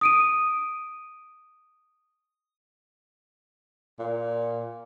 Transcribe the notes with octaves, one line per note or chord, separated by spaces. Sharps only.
D#6 D7 D#7
A#2